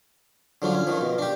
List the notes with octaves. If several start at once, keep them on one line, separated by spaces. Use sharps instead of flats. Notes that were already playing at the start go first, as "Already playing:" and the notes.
D3 F3 F#3 D4
C#4
D#3 F3
B2
D4 G4